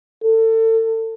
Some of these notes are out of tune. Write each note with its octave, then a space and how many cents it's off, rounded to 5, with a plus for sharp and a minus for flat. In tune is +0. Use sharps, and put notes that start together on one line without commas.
A4 +30